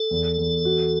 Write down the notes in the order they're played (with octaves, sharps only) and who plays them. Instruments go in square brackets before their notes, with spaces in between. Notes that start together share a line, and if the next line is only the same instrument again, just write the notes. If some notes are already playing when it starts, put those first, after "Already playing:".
Already playing: [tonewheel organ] A4
[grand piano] E2
E2
F#4